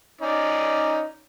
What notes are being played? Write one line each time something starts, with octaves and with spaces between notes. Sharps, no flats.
C#4 D#4 D5